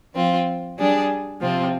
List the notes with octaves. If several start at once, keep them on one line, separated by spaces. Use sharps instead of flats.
F3 C4 F4
G3 D4 G#4
C3 F3 C4 F4